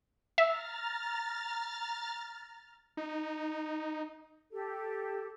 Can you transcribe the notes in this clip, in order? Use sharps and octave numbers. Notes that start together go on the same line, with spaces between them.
E5 A#5 F6 A6
D#4
G4 A4